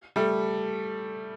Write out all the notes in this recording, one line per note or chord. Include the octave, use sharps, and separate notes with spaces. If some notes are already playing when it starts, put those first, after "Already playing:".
G3 A3